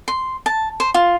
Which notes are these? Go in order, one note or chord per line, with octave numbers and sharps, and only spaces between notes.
C6
A5
C5
F4